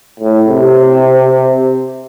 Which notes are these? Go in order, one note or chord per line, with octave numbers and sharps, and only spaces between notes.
A2
C3